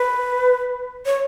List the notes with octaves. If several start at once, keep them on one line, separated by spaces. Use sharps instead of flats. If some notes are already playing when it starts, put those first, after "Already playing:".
Already playing: B4
C#5